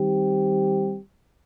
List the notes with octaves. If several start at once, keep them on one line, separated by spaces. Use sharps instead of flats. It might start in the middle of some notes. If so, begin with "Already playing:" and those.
Already playing: D#3 G3 C4 G4